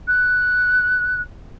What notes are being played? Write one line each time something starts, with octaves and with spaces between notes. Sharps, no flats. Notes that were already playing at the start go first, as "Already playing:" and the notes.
F#6